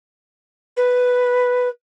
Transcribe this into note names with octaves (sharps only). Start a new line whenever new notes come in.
B4